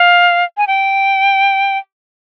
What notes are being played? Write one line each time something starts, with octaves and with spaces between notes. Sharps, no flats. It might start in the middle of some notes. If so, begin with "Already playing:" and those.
Already playing: F5
G#5
G5